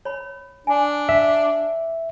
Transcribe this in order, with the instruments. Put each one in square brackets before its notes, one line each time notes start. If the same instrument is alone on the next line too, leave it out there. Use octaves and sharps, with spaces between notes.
[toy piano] C#5 B5
[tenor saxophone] D4 [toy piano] G#5
[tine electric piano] E5